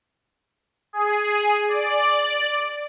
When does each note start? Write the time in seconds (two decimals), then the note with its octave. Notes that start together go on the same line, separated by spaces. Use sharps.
0.93 G#4
1.68 D5